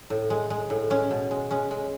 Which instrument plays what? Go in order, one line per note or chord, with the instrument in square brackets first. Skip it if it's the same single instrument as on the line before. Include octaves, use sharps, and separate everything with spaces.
[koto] A2
G#3
G#3
A2
G#3 C#4
B2
G#3
G#3 C#4
G#3